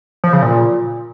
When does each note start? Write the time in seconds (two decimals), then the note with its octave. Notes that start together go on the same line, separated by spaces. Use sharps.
0.24 F3
0.33 C#3
0.42 A#2